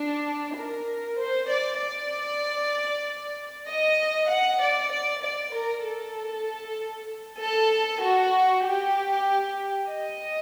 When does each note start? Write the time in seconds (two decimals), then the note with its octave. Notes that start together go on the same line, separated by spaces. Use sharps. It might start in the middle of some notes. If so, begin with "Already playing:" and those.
Already playing: D4
0.57 A#4
1.19 C5
1.50 D5
1.81 D5
3.68 D#5
4.30 F#5
4.62 D5
4.92 D5
5.23 D5
5.54 A#4
5.85 A4
7.41 A4
8.03 F#4
8.65 G4
9.89 D#5